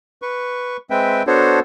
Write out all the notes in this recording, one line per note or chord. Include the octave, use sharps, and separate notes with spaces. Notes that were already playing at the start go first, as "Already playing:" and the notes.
B4 C#6
G#3 C4 B4 E5 G5
B3 D4 F#4 A4 C5 C#5